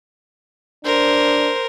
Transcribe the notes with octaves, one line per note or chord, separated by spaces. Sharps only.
D4 A#4 C5